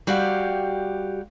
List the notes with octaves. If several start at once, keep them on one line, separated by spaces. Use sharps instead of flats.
G3 F#4 G4 F5